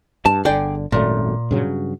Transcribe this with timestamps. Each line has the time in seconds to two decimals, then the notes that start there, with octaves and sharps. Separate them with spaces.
0.26 G2 A5
0.45 G1 D3 G#4 D5 G5
0.92 G#1 F#2 A#2 A3
1.51 G2 C#3 F#3